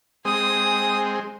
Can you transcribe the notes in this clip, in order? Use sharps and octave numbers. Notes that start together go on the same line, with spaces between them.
G#3 C4 G#5 D#6